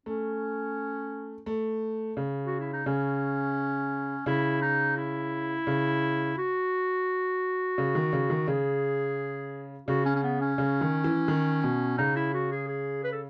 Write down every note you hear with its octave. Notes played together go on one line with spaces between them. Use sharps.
A3 C#4
A3
C#3
F#4
E4
D#4
C#3 C#4
C#3 E4
D#4
E4
C#3
F#4
C#3
D#3
C#3
D#3
C#3 G#4
C#3 F#4
C#4
C#4
B3
C#4
C#3
D#3
E3
D#3
B2
C#3 D#4
E4
F#4
G#4
G#4
B4
A4